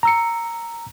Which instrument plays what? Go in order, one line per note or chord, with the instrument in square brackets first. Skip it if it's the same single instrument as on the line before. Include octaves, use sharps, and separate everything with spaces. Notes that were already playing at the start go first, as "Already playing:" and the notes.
[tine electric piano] A#5 E6 C#7